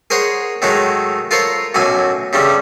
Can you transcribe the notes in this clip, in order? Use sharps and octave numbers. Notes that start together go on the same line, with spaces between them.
G#4 A#4 C5 C#5 F#5
A2 D#3 F#3 G#3 A3 D#4
F4 A4 A#4 C5 C#5
B1 F#2 A2 F#3 G#5
G2 C#3 G3 A3